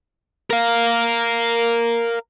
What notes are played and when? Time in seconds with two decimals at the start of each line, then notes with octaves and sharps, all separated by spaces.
0.51 A#4 F5